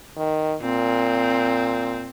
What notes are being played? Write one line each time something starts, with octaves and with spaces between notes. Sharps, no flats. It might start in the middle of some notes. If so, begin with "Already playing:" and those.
D#3
A#2 C4